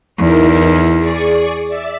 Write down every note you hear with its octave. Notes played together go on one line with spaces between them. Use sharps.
E2 D#4 E4 A#4
G#4 D5 C#6
D5 E5